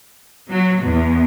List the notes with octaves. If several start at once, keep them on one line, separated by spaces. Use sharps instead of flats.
F#3
E2